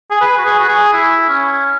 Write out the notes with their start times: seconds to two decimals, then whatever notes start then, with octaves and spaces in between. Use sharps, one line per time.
0.11 G#4
0.21 B4
0.38 F#4
0.45 G#4
0.59 F#4
0.68 G#4
0.93 E4
1.29 C#4